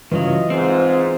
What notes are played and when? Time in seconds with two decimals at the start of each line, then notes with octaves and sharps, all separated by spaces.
0.12 G2 C#3 E3 F#3 F4 D#5
0.50 G#2 C4 F4 C5